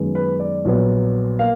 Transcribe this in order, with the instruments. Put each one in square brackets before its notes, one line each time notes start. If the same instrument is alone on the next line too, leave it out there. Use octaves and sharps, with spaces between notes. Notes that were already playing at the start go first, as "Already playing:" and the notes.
Already playing: [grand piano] F#2 D#3 G#3 B3
B4
D5
A#1 A#2 F#3 B3
A#3 F5